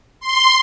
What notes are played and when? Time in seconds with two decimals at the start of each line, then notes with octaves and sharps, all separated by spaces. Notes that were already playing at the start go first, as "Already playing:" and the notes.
0.20 C6